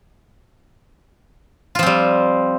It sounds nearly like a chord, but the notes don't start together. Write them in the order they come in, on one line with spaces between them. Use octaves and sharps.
F4 F3 C4 G3